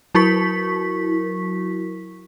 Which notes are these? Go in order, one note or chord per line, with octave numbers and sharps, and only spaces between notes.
F#3 E4 F#4 A#4 C#6 B6